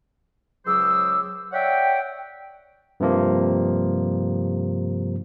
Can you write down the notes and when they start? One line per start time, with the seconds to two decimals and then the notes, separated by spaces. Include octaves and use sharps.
0.66 C#2 F#3 G#4 C5 D6 E6
1.52 C#5 D5 E5 F#5 G5
3.00 G2 C3 F3 A#3